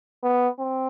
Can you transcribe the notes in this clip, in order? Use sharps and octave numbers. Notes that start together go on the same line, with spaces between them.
B3
C4